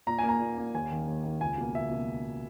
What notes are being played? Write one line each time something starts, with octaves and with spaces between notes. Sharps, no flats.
A#2 A#5
A#3 G#5
A#5
A#2
A#3
D#2 G#5
D#3 A#3
D#2
D#3 A#3
C#2 G#5
B2 A#3
C#2 E5
B2 A#3